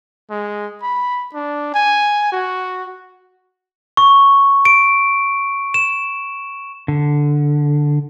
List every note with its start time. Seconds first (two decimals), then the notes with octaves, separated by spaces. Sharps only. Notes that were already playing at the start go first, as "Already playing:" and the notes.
0.30 G#3
0.82 B5
1.34 D4
1.74 G#5
2.32 F#4
3.97 C#6
4.65 D7
5.74 E7
6.88 D3